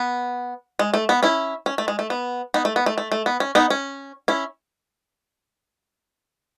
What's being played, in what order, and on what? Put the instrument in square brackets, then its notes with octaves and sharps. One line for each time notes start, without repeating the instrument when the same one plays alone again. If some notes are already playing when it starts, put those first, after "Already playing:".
Already playing: [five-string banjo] B3
G#3
A3
B3
C#4 E4
C#4
A3
G#3
A3
B3
B3 D#4
A3
B3
A3
A3
A3
B3
C#4
B3 D#4
C#4
C#4 E4